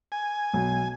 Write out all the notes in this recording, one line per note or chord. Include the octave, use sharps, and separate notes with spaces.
G#5
B1